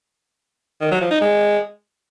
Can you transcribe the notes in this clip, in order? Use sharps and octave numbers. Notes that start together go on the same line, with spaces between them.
D#3
F#3
F3
D#4
G#3